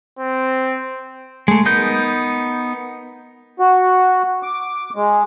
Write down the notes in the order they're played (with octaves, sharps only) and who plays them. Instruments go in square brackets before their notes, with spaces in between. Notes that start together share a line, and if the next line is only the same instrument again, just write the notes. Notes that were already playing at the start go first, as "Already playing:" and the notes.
[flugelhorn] C4
[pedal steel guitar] G#3 A3
B3 D#4 A#4 G6
[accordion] F#4
D6
G#3